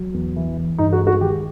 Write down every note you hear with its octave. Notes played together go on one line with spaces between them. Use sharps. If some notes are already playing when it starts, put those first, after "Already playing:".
Already playing: F#3
E2
E3
E3
G2 D#4
F#4
G#3
F#4
D#3 G4